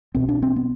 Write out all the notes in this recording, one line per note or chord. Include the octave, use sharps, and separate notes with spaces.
B1 B2 C4
D4
C4
B3